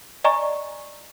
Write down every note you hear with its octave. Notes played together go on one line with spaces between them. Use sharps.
D5 D#5 G#5 A#5 C#6